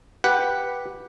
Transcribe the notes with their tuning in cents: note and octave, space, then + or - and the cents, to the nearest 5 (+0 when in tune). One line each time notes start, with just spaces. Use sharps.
G4 +0 B4 -5 F#5 +0